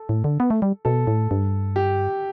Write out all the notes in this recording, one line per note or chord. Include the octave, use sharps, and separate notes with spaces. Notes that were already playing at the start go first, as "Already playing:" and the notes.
Already playing: A4
A2
D3
B3
A3
G3
B2 A4
A2
G2
G4